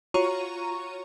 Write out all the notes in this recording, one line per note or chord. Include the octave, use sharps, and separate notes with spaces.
F4 F#4 C#5 A#5 C#6 D#7